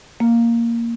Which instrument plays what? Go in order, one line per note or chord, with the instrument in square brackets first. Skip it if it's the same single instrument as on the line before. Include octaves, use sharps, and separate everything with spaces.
[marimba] A#3